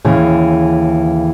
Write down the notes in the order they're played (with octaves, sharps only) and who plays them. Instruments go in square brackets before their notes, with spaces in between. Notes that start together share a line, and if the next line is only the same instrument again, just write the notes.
[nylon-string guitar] D#2 C#3 E3 G#4